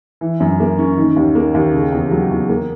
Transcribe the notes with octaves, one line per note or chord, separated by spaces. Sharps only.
E3
F#2
A#3
C#4
D#3
D#2
A#3
D#2
C#3
E2
F#3
E2
A#3